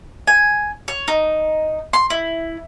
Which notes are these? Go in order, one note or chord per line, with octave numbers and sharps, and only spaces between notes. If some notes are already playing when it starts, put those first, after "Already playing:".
G#5
C#5
D#4
C6
E4